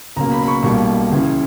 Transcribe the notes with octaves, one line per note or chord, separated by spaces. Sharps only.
C#2 B2 F#3 A#3 A#5
B5
B5
C#6
B1 B2 G3 A#3 C#6
C#2 C#3 E3